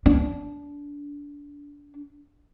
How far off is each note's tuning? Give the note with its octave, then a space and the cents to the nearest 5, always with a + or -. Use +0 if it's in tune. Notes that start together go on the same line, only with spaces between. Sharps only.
D4 -25